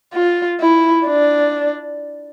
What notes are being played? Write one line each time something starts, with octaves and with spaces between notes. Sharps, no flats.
F4
E4
D4